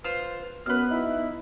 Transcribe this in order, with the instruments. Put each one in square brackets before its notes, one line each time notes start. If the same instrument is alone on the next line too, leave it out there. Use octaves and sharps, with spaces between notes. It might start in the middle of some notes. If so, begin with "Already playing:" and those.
[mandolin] F4 C5 [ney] B4
[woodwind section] F#2 [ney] B3 [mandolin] B4 F6
[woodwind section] D#4 E4